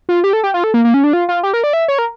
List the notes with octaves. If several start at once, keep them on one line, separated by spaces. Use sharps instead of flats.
F4
G4
A4
G4
F4
A4
A#3
A#3
C#4
D4
F4
F4
G4
A#4
D5
E5
C#5
A#4